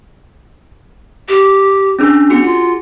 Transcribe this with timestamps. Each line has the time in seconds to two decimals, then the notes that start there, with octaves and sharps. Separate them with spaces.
1.28 G4
1.99 C#4 D4 G#4
2.30 B3 F#4 G#4 C#7
2.43 F4